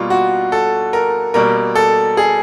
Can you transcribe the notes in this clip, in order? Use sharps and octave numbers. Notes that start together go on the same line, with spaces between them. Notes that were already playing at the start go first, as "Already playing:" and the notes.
Already playing: B2 G3 A#3 F4
F#4
A4
A#4
B2 G3 A#3 A#4
A4
G#4